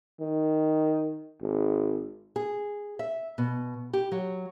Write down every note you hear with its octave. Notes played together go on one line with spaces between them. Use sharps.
D#3
G#1
G#4
E5
B2
G4
F#3